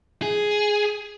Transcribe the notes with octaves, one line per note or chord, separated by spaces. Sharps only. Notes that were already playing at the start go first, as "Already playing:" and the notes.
G#4